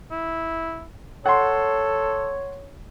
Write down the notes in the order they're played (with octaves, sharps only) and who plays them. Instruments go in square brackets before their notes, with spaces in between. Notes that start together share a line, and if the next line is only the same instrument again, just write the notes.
[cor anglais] E4
[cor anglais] A4 [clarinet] C#5 [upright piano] F#5 C6